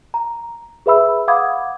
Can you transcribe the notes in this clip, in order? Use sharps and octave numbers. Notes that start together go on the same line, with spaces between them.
A#5
G#4 B4 E5 B5 E6
F5 F#5 B5 D6 D#6 G#6